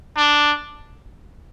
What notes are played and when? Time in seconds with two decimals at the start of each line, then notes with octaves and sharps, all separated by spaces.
0.16 D4